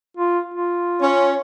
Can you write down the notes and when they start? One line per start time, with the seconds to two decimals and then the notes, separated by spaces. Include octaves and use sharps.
0.17 F4
0.54 F4
1.01 C#4